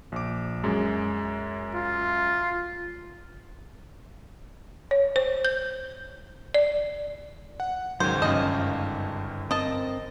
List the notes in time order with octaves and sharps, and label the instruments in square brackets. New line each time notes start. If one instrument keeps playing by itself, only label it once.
[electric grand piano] A#1 D6
F#2 G#3
[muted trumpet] F4
[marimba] C#5
C5
G6
D5
[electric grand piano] F#5
[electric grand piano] C#2 G#2 D#3 [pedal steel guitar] F#3 C#5 [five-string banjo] C5
[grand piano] G1 F#2 [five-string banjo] B3 D#5 [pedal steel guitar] F5 A5
[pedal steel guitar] C4 A#4 [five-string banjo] D#5 A5